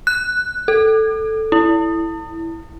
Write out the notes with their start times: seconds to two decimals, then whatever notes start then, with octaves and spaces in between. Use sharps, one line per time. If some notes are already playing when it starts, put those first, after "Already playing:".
0.07 F#6
0.68 A4
1.52 E4